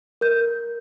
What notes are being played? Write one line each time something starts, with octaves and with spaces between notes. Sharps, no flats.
A#4 G6